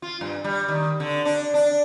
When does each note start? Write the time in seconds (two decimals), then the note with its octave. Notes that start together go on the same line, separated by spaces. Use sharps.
0.02 F4
0.21 G2
0.44 G3
0.68 D#3
1.00 D3
1.25 D4
1.54 D4